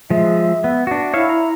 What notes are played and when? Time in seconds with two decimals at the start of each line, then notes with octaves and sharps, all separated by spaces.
0.10 F3 G#3 E5
0.64 B3
0.87 D4 F#4
1.14 E4 C#5 E5 F5
1.29 A#5